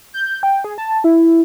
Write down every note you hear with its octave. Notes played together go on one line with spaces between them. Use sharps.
G6
G5
G#4
A5
E4